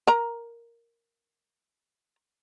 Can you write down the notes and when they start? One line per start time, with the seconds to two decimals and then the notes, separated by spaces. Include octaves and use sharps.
0.07 A#4 A#5